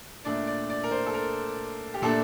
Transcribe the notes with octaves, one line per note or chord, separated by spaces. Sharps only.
A#2 A3 D4 D5
D5
D5
A#4
C5
A4
A#4
G4
A#2 A3 D4 A4